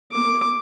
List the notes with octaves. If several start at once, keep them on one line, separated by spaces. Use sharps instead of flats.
D6